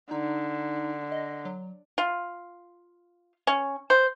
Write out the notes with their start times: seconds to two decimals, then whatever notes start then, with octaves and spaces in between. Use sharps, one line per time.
0.11 D3 D#4
1.12 D#5
1.45 F#3
1.98 F4
3.47 C#4
3.90 C5